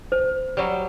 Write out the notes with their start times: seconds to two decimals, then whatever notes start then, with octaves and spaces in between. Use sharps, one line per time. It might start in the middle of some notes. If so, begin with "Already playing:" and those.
0.12 C5
0.57 F#3 G3